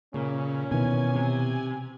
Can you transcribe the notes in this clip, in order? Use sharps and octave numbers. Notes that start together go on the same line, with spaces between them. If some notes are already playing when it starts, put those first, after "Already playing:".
A#2 C#3 C#4
B2 D#3 E3 G#5
C3